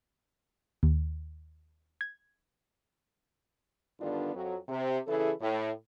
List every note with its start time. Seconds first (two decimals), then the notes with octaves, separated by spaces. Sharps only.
0.83 D#2
2.01 G#6
4.00 G2 D3 D#3 B3 D4 F4
4.35 F2 F#3
4.69 C3
5.08 C#3 E3 E4 G#4 A4
5.41 A2